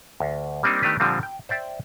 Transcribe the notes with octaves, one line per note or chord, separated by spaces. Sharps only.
D2
G3 A#3 C4 D4 D#4
D#3 A3 B3 D4 G4 B4
A#2 D3 F3 G3 C4
G5
C5 D5 E5 G5